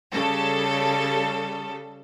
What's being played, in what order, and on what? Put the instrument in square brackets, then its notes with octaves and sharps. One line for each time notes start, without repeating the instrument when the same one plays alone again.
[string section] C#3 G3 A4